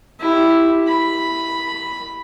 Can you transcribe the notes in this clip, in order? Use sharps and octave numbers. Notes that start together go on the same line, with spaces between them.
E4 G4
B5